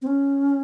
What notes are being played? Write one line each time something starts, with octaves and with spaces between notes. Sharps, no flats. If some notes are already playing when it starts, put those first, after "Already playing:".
C4
C#4